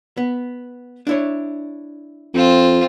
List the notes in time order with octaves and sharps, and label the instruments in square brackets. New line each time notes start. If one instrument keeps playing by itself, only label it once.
[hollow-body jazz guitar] B3
D4 E4 C#5
[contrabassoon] F2 [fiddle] C4 F4